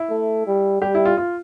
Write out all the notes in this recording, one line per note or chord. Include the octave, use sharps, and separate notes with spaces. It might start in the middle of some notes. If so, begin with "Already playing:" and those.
Already playing: E4
A3
G3
G3 G4
E4
F4
F4